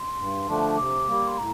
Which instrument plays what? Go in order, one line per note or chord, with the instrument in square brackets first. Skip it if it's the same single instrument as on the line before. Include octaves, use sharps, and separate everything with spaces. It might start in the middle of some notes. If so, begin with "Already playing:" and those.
Already playing: [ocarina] C6
[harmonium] G2
D3 F3 A3 D4
[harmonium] C3 [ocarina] D6
[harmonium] G3 A#3
[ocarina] C6
[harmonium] A2 [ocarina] A#5